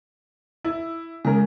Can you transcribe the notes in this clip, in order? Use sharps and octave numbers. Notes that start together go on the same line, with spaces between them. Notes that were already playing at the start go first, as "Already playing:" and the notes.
E4
C#3 G#3 A#4